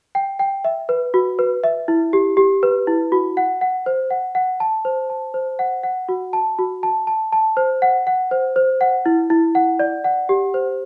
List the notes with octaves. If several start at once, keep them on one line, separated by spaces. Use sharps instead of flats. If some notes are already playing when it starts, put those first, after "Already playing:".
G5
G5
E5
B4
F#4
B4
E5
E4
G4
G4
B4
E4
F#4
F#5
F#5
C5
F#5
F#5
A5
C5
A5
C5
F#5
F#5
F#4
A5
F#4
A5
A5
A5
C5
F#5
F#5
C5
C5
F#5
E4
E4
F#5
D5
F#5
G4
C5